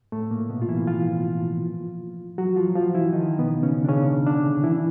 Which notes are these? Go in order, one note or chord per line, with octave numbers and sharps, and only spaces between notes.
A2 A3
A#2 A#3
B2 B3
F4
E3 E4
F3 F4
F#3 F#4
F3 F4
F3 F4
E3 E4
D#3 D#4
B2 B3
C#3 C#4
D4
C#3 C#4
D3 D4
E3 E4